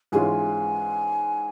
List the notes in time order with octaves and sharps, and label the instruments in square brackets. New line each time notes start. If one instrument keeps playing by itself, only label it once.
[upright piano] G#2 E3 G#3 C#4 F4 [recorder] G#5